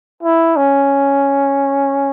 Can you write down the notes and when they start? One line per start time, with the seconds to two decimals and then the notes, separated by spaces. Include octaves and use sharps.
0.23 E4
0.56 C#4